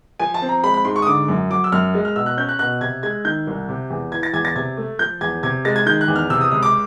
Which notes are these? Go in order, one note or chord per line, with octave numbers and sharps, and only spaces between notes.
F3 G#5
A5
C4
A#5
G#3 B5
B5
G#2 C6
C#6
D#6
D3 D6
F#2
F#3 D6
E6
F#2 F6
G#3
F6
B2 E6
F#6
C#4 G6
F#6
B2 F#6
C3 G#6
G#3 G#6
D#3 G6
C2
C3
E2
E3 G#6
A6
E2 G#6
A6
C3 G#6
A3
F3 G6
E2 G#6
C3 G#6
G#3 A6
G#6
D#3 G6
F#6
E2
F6
C3 E6
D#6
C#2 D#6
D6